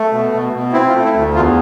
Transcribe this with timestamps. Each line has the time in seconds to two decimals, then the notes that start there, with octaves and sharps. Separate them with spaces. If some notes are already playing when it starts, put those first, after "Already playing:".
Already playing: A3
0.11 B2
0.32 B2
0.53 B2
0.72 C4 E4
0.89 F4
0.93 A3
1.04 E4
1.13 D2
1.34 E2 F4